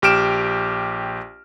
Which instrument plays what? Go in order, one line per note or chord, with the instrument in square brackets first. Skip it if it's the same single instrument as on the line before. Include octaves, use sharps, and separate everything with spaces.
[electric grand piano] A#1 G4 F6 D7 E7